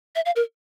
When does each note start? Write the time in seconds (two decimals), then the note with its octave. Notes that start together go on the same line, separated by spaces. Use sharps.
0.16 E5
0.26 F5
0.36 A#4